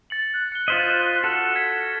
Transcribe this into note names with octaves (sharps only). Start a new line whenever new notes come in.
A6 C#7 F#7
F#6
C#7 G7
F4 C5 D#5 F6 B6 F#7
F#4 A4
G#6 B6